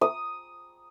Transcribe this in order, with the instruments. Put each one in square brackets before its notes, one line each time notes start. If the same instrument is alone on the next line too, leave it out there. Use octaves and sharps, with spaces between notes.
[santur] D#6